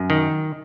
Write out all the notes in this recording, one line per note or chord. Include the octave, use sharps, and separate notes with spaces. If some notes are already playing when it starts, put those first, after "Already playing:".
Already playing: F#2
D#3